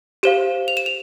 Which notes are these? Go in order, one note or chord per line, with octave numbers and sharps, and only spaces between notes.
G4 C5 F5 E7
F7
E7
F7